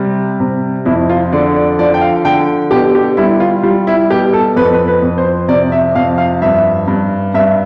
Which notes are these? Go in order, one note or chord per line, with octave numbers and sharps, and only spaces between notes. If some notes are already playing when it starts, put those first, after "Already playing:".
Already playing: C3 G3
C3
F2 E4
F4
D3 D5
D5
F3 D5
G5
F5
D3 G5
B2 G4
G4
G3 E4
F4
G3 F4
E4
B2 G4
A4
F2 B4
A4
B4
B4
F2
C5
C3 D5
E5
F2 F5
F5
G2 E5
G2
G2 E5